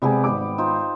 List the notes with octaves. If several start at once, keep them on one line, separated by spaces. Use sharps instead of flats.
C3 G3 G#3 B3 G4 G#5
G#1 D6
D#4 F4 C5